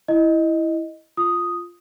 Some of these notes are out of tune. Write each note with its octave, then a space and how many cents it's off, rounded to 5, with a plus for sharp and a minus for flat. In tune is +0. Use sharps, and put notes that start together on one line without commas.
E4 +0 D#5 +0
F4 +0 D#6 +0